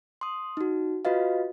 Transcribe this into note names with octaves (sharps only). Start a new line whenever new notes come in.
C6 D#6
D#4 F#4
F4 F#4 B4 D#5 F5